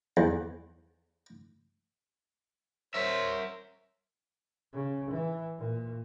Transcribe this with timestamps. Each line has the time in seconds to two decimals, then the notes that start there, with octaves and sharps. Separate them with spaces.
0.17 E2
2.94 A#4 C5 C#5 E5
4.73 C#3
5.11 E3
5.58 A#2